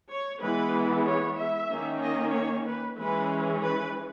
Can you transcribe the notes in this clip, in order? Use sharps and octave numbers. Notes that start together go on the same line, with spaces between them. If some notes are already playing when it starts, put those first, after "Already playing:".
C#5
E3 G#3 B3 B4
C#5
E5
D#3 A#3 C#4
D#5
C#5
B4
E3 G#3 C#4 B4
B4